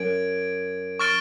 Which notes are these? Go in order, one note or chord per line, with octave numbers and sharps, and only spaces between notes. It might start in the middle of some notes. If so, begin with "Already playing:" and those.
Already playing: F#2 G#6 D7
C#6 F6 A6 D7 G7